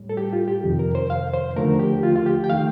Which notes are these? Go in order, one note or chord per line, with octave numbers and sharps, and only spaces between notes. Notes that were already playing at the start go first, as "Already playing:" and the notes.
Already playing: A2 G3
A4
G4
F4
G4
F2 C3 D#3
A#4
C5
F5
C5
D#2 D3 F3 A3 A#4
G4
F4
F4
G4
G5
D#3 A3 F5